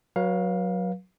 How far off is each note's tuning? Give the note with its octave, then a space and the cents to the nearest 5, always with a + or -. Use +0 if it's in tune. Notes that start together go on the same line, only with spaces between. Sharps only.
F#3 -5 B4 -40 F5 +10